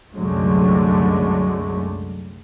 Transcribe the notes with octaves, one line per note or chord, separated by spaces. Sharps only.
C2 F#2 D3 F#3 G#3 A3